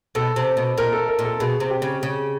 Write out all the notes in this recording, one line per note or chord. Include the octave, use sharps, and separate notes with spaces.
B2 A4
C3
B2
A#2 A#4
A4
A#4
A#2
A4
B2 G#4
C3
G4
C#3
C#3